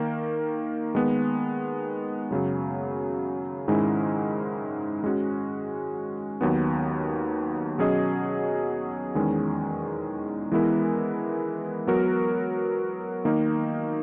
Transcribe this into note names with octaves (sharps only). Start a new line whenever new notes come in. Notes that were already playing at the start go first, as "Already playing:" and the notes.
Already playing: D#3 A#3 A#4
D#3 G#3 B3
F#2 C#3 F#3
G#2 D#3 G#3 C#4 E4
G#3 C#4 F#4
D#2 D#3 F#3 B3
B2 F#3 C#4 G#4 D#5
E2 D#3 G#3 C#4
E3 G#3 B3 E4 A#4
F#3 B3 F#4 A#4
D#3 A#3 D#4